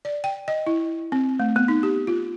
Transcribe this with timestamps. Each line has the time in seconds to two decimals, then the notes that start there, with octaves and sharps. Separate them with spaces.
0.05 D5
0.24 G5
0.48 D#5
0.67 E4
1.12 C4
1.40 A3
1.56 B3
1.68 D#4
1.83 G4
2.07 F4